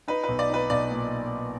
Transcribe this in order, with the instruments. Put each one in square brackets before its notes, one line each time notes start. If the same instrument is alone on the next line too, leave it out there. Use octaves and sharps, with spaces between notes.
[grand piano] D#4 [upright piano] B4
[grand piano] B1 [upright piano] B4
[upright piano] D5
[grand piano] D#4 [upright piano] B4
[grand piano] B1 [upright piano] D5
[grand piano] A#2